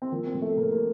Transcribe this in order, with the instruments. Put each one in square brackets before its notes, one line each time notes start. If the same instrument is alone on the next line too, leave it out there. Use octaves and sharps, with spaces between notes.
[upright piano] C4
F3 A#3
C4
A2
A3
A2 A#3
A#3